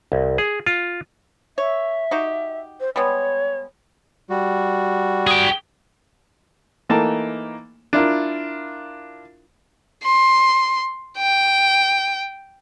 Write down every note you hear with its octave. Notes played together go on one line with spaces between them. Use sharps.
C2
G#4
F4
C#5 E5
D#4 F#4 G4
C5
G3 G#3 B3 C#5
G3 F#4
G#4 G5
E3 A3 A#3 D#4 G5 A5
D4 E4 F4 A#4
C6
G5